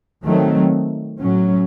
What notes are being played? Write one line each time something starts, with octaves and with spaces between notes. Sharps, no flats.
D#3 F#3 A3 C4
A2 F#3 C#4